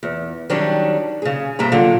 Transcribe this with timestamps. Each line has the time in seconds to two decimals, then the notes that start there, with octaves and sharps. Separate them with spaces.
0.03 E2
0.50 D#3 F#3 G3 C#4 D4
1.22 C#3 G#4
1.59 G2 C3 G3 A#3 A#5
1.72 A#2 D3 F#3